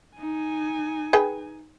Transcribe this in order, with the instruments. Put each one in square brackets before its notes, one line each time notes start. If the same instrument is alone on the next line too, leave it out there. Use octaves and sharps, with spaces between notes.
[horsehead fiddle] D#4 G#5
[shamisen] G#4 B4 G5